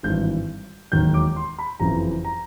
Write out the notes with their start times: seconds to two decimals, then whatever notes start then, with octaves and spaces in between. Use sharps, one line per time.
0.03 G#1 G2 E3 G6
0.92 E1 D#2 D#3 F#3 G6
1.14 D6
1.36 C6
1.59 B5
1.80 F#1 F2 C#3 E3 A#5
2.25 A#5